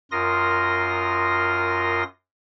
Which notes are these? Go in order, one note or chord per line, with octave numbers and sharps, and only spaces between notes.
F#2 F4 A#4 C6 D#6 A#6